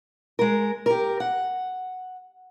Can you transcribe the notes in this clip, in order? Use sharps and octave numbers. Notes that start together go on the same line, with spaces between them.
G#3 A#4
G4 A#4
F#5